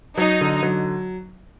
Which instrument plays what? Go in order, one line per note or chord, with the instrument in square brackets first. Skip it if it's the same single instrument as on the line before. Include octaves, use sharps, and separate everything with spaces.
[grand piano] F#3 [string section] D#4
[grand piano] D3
F#3